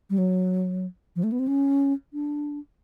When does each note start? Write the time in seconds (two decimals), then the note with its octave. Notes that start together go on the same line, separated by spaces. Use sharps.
0.10 G3
0.18 F#3
1.16 F3
1.23 A3
1.32 B3
1.39 C4
1.48 C#4
2.13 D4